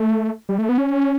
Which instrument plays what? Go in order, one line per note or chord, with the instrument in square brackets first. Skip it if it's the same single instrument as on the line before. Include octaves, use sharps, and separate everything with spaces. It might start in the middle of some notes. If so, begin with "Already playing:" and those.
Already playing: [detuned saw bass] A3
G3
A3
B3
C#4